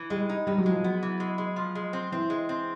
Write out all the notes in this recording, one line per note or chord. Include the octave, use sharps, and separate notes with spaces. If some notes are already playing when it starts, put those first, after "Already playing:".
Already playing: E3
G3 G#3
D#4
G3 D#4
F#3
F3 G#3
F#3 B3
E3
G#3
G#3
F3
G#3
C4
E3 C4
G#3
C4